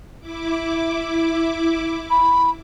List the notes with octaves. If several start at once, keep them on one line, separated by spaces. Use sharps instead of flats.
E4 D6
B5